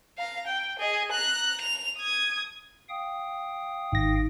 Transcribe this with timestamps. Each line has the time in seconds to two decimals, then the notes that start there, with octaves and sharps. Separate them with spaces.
0.18 F5 A#5
0.47 G5
0.79 G#4 D#5
1.12 A#5 F#6
1.61 F7
1.98 D#6 G#6
2.89 F5 G5 D#6
3.92 G#1 D#4 A#6